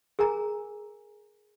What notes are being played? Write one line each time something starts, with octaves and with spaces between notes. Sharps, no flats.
G#4 A#4 G#5 A#5